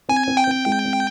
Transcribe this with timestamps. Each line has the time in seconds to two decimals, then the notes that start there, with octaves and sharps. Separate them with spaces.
0.09 C4 G#5
0.28 C4
0.37 G5
0.47 C4
0.66 G#3
0.85 C4